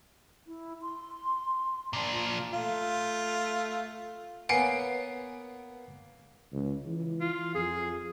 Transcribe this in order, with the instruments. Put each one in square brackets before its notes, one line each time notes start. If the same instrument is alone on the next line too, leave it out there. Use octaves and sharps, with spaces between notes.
[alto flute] E4
C6
[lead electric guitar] A#2 D4
[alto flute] F4
[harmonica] A3 F4
[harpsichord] A#3 B3 [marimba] B4 C#5 [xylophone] F#5 G#5 [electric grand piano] C7 D7
[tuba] C#2
E3
[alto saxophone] F4
[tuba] F2 [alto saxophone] G#4